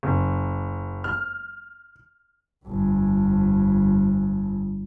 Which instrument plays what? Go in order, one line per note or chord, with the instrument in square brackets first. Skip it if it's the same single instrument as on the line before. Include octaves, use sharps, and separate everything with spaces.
[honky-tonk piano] F#1
F6
[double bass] G1 F2